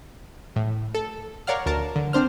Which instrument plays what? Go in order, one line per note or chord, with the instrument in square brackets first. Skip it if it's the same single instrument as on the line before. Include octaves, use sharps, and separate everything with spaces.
[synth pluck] A2
A4
A#4 C#5 D5 F5 F#5 F6
D2 A#4 A5
D3
C4 D4 C5 F6